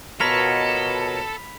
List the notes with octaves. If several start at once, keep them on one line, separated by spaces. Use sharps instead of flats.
B2 F4 A4 A#4 C#5 B5 B6 F7